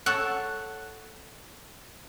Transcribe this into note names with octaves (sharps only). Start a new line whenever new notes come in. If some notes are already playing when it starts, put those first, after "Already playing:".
A4 C#5 F#5